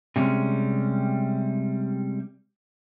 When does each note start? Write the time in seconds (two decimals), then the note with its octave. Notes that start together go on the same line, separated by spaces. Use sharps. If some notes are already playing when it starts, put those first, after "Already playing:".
0.16 C3 G3 G#3 C#4